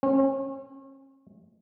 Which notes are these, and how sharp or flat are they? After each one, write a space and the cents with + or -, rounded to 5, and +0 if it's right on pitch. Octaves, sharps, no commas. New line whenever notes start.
C#4 -40